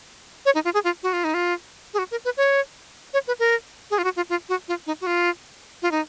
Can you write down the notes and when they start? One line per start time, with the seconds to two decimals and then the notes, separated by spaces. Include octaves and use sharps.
0.45 C#5
0.55 D#4
0.65 F4
0.74 G#4
0.84 F4
1.03 F#4
1.13 F4
1.24 D#4
1.34 F4
1.94 G#4
1.99 F#4
2.11 A#4
2.25 B4
2.37 C#5
3.14 C#5
3.28 B4
3.39 A#4
3.91 G#4
3.98 F4
4.04 F#4
4.16 F4
4.29 F4
4.49 F#4
4.68 F4
4.87 D#4
5.01 F#4
5.07 F4
5.82 F4
5.92 D#4